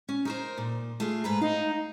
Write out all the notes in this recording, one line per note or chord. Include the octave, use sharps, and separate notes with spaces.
C#4
D#4 A#4 C5
A#2
A3 F4 G#4
G#2 B4 A#5
D#4 F5